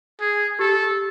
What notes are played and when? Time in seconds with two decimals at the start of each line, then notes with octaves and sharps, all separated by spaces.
0.21 G#4
0.59 G4 A4